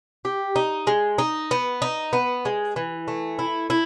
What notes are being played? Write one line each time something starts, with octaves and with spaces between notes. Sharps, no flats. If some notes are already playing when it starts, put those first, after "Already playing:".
G4
D#4
G#3
D#4
B3
D#4
B3
G#3
E3
A3
E4
E4